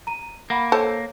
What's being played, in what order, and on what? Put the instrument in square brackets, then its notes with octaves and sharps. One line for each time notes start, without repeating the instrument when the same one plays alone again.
[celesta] A#5 D#7
[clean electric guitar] A#3 [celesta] F#5 B5
[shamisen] A4 C5 A5 [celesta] C#5